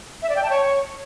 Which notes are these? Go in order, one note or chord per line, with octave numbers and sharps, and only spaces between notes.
E5
D5
G5
A5
C#5